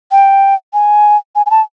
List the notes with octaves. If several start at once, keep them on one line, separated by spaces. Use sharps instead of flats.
G5
G#5
G#5
G#5
A5